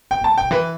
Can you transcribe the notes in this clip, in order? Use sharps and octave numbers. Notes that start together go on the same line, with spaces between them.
C4 G5
B3 A5
C3
B2 G5
E3 B4